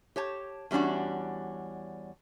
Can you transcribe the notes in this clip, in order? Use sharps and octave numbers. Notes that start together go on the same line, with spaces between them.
G4 C#5 A5
E2 G3 C#4 D4 F#4